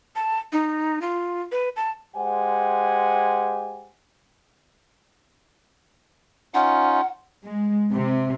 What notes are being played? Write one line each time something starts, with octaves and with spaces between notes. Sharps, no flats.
A5
D#4
F4
B4
A5
G#3 G4 C5 F#5 G#5
C#4 D#4 F4 F#5
G#3
C3